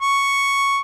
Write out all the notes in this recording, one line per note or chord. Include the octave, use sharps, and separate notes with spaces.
C#6